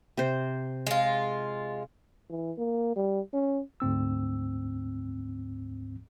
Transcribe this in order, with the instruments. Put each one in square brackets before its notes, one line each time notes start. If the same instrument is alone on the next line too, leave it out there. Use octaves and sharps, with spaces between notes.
[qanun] C3 C5
[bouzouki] G#3 F4
[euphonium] E3
A#3
G3
C#4
[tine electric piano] D2 G#2 C4 E6